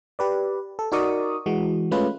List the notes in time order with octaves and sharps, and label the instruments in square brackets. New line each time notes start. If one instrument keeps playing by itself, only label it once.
[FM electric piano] G4 B4 D5
A4
D#4 F#4 A#4 D5 C#6 D#6
E3 G#3 F#4
G#3 A3 C#4 F4 B4